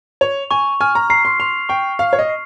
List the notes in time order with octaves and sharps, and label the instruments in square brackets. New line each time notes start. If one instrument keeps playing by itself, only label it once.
[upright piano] C#5 [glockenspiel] F7
[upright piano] G#5 [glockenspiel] C#6
[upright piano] G#5 [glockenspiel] F6
[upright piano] A#5
[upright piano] A#5 [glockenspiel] C7
[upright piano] C6
[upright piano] C6 [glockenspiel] F7
[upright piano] G5 [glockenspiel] C#6
[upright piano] F5 [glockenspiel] F6
[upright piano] C#5
D#5
[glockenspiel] C7